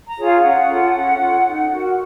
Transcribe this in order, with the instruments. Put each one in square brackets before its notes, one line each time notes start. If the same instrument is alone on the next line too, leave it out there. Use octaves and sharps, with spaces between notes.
[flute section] A#5
F4 G#4 C#5
F5
C#4 F#5
F4 A4
C#4
F4 A4
D#4
F#4 A#4